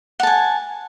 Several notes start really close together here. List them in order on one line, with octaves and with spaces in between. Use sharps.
F#5 A5 G#5